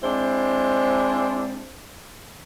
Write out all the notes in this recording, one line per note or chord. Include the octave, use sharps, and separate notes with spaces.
G#3 C4 D4 E4 C5